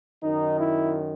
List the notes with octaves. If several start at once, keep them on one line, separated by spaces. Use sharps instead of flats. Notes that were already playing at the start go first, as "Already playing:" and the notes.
F#2 D#3 D#4
E4